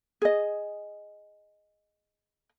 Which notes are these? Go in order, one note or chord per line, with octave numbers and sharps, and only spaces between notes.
G#4 D#5